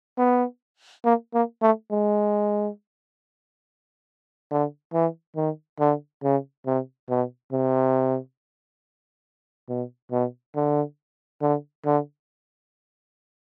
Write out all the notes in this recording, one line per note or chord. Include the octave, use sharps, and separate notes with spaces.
B3
A#3
A#3
A3
G#3
D3
E3
D#3
D3
C#3
C3
B2
C3
B2
B2
D3
D3
D3